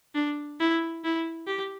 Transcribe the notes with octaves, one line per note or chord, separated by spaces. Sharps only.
D4
E4
E4
G4